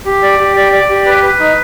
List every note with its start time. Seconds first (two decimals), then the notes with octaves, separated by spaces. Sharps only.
0.05 G4
0.22 D5
0.39 G4
0.56 D5
0.72 D5
0.89 G4
1.06 B4
1.23 B4
1.39 D#4